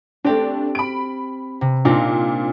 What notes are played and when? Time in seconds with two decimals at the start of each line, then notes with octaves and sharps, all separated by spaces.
0.25 A3 C4 D4 G4
0.75 B5 D7
1.61 C3
1.85 A#2 C4 D4 D#4